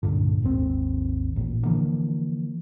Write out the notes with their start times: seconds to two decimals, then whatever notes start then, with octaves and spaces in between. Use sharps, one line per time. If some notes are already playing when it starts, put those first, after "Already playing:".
0.03 C#2 G2 A#2 D3
0.42 G#1 D#2 C4
1.36 A1 A#2
1.65 D3 E3 F3 A#3